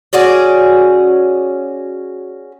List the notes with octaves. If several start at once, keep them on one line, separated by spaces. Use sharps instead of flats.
C#4 F#4 G#4 D5